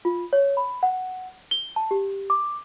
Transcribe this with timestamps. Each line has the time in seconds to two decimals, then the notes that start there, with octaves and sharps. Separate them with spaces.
0.05 F4
0.33 C#5
0.57 B5
0.83 F#5
1.51 G7
1.76 A5
1.91 G4
2.30 D6